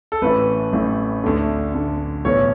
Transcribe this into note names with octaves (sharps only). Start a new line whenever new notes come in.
A4
A1 A2 E3 B4
A1 A2 E3
D2 D3
D2 D3
B1 A2 E3 C#5